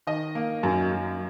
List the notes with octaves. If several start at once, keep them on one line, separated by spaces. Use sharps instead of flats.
D#3 D#5
A#3
F#2
F#2